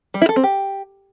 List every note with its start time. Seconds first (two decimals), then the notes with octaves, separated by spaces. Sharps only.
0.14 G3
0.22 E4
0.29 A4
0.36 C4
0.43 G4